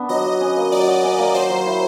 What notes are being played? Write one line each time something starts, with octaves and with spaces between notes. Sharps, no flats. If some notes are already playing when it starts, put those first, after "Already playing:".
Already playing: B3 D4
F#3 D#5
F#4
C#4
A#3
F#3 D5
F#4
C#4
A#3
F#3 C5
F#3
E4